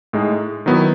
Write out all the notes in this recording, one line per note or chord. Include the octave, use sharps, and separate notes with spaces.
A2 G#3 D#4
D#3 F#3 B3 E4